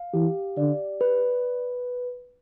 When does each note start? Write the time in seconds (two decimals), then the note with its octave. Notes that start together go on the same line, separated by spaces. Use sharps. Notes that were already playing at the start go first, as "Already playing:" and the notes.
Already playing: F5
0.13 E3 G4
0.57 D3 D5
1.01 B4